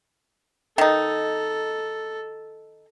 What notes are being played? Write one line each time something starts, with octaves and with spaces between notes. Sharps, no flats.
D#3 D#4 A4